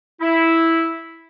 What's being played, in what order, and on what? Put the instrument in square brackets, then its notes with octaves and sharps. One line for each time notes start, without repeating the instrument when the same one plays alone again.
[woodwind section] E4